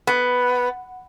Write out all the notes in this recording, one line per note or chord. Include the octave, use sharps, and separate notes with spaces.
B3